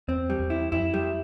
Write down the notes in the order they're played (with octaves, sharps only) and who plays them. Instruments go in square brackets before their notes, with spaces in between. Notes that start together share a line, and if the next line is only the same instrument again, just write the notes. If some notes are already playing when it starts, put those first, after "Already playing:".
[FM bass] E2 [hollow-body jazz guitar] C4
[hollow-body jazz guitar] G3
[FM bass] E2
[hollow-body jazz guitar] E4
[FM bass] F2 [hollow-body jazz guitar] E4
[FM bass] F#2
F2
[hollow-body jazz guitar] G3